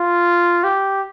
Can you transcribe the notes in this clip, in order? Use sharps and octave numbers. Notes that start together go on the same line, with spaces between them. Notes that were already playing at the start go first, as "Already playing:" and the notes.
Already playing: F4
G4